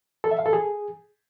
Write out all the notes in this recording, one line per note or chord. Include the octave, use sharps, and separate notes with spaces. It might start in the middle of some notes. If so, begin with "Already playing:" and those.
A4
E5
F5
A4
G#4